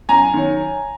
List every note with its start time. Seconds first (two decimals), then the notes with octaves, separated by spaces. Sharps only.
0.09 F#2 G#5 A#5
0.34 D#3 F#3